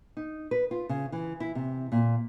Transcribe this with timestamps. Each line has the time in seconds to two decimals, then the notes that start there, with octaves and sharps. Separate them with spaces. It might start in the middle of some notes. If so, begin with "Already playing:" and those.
0.17 D#4
0.51 B4
0.71 F4
0.89 C#3
1.12 E3
1.40 E4
1.55 C3
1.92 A#2